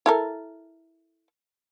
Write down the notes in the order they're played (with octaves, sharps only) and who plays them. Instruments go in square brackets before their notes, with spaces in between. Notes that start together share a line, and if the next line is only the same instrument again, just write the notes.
[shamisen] E4 A4 A#4